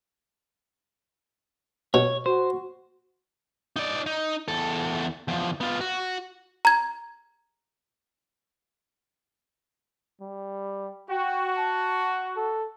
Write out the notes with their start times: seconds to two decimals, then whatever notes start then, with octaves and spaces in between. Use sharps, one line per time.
1.94 B2 C#5
2.26 F#4 C5
3.76 D#4 D5
4.06 D#4
4.48 E2 A4
5.28 E2 F3
5.61 B3 F4
5.81 F#4
6.65 A#5 G#6
10.21 G3
11.10 F#4 G5
11.58 A5
12.37 A4